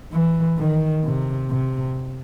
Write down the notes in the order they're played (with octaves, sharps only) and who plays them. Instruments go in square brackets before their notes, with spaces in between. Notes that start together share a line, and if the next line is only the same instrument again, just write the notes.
[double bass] E3
D#3
C3
C3